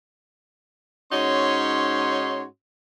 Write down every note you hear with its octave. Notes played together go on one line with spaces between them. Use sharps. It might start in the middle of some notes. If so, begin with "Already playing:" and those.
G#2 C#4 D#4 F#4 C#5 C6